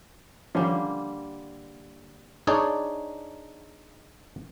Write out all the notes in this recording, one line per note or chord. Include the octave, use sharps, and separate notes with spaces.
D3 D#3 F3 G3 A#3 C#4
D4 D#4 G#4 C#5 D5